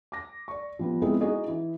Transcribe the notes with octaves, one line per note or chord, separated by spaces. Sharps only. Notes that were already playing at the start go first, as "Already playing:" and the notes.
D6 A#6
D5 C#6
F3 G3 B3
G#3 B3 C4 D#4 E4 G#4
D#4 E4 F#4 G#4 D#5
E3